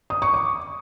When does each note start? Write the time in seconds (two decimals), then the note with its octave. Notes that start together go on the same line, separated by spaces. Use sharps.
0.10 D#6
0.22 C#6
0.34 D6